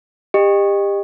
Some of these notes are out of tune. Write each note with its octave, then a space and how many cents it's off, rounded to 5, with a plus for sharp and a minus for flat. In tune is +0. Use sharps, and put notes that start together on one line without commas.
G4 +25 D#5 -25